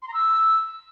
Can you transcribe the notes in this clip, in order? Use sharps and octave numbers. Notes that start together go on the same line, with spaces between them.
C6
A#5
E6